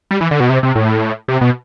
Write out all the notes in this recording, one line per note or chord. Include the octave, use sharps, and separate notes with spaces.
G3
E3
D3
B2
C3
C3
A2
C3
B2